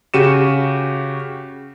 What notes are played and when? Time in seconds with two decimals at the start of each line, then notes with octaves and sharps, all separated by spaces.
0.14 C#3 F#4 G4 C#7 D#7 E7